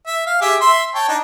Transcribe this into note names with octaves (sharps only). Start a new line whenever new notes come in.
E5
F5
G4 G#4 E5
E5 C6
C#5 G5 A5
D4 D#4